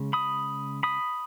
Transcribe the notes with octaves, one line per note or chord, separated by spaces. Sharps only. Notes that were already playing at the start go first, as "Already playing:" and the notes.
Already playing: C#3 G#3 C#4
B5 D#6
B5 D#6